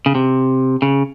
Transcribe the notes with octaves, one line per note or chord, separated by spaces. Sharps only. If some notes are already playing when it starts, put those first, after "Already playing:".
C#3
C3
C#3